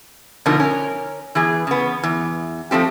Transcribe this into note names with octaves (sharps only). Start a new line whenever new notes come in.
B2 D3 F3 A3 D#4 A#4
C#4 A#4
E3 B3 G#4
C#3 B3
E2
F3 A3 C4 G4